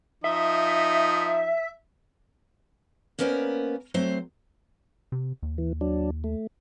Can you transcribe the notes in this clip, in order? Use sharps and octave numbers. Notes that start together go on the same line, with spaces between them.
F3 D#4 E5
A#3 B3 C#4 A#4 C5 D5
F#3 A3 C4 C5
C3
D#2
E3
F#3 D4
A3